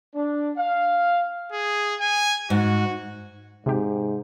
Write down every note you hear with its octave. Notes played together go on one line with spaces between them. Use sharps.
D4
F5
G#4
G#5
G#2 F#4
G#2 C3 G4